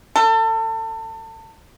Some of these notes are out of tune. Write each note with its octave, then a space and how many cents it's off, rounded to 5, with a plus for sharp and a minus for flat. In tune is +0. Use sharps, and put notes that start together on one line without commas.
A4 +30